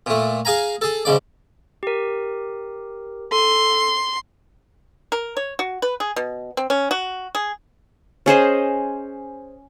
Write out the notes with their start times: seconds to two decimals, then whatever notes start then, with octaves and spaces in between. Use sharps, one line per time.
0.06 A#2 A3
0.45 G#4 F5 G#5 A#5
0.81 G#4 A4
1.05 G#2 C#3 D5
1.83 G4 A#4
3.32 A4 C6
5.12 A#4
5.37 C#5
5.59 F#4
5.82 B4
6.00 G#4
6.16 B2
6.57 C4
6.70 C#4
6.91 F#4
7.35 G#4
8.26 C#4 G#4 C5 D#5